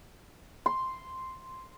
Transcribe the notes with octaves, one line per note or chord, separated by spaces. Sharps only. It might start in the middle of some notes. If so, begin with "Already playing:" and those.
C6